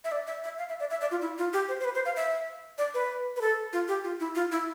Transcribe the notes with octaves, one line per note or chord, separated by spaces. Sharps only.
E5
D5
E5
E5
F5
E5
D5
E5
D5
F4
E4
F4
G4
C5
C5
B4
C5
F5
E5
D5
B4
B4
A4
F4
G4
F4
E4
F4
E4